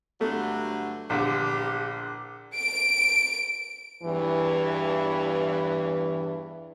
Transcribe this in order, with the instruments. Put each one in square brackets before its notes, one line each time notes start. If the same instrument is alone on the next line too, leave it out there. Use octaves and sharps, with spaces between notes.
[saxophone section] G2 D3 F#3 [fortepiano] A3
[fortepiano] A#1 D3 [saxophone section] E2 G4
[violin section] D7
[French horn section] E2 G2 E3